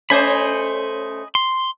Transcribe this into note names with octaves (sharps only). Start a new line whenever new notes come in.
A3 C#4 C5 D#5 G#5 B5
C6